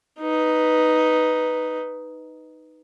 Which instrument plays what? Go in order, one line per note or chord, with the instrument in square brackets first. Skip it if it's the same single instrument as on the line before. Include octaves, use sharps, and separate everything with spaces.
[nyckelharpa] D#4 B4